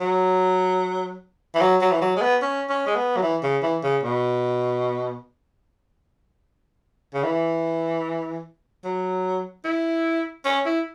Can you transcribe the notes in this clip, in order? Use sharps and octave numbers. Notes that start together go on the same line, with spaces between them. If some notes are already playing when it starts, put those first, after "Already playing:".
F#3
E3
F#3
F#3
E3
F#3
G#3
B3
C#4
C#4
G#3
B3
F#3
E3
C#3
E3
C#3
B2
C#3
E3
F#3
E4
C#4
E4